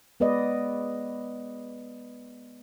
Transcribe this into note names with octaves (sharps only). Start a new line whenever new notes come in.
G#3 B3 B4 D5 D#5